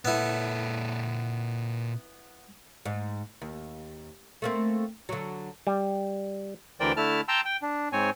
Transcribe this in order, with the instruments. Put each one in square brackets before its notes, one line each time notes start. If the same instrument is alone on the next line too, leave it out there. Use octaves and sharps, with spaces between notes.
[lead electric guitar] A#2 A4 [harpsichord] B3 E4
[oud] G#2
D#2
A3 A#3 C4
D3 F#3
[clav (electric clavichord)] G3
[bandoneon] D2 E3 A#4 C5 D5 G5
D3 A3 E4 A5 F6
G5 A5 A#5 C6 E6
G5
D4
G#2 C4 C#5 G#5